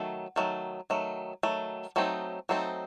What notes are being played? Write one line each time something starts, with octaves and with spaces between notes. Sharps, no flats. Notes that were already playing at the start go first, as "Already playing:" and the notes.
Already playing: D#3 F#3 A3
D#3 F#3 A3
D#3 F#3 A3
D#3 F#3 A3
F#3 A3 C4 D#4
F#3 A3 C4 D#4